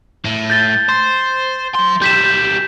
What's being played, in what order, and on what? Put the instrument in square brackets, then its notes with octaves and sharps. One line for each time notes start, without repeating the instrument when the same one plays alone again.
[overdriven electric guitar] A2
[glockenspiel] G6 A6 G7
[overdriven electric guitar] C5
F#3 C6
[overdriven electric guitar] B1 G3 [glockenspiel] G6 B6 E7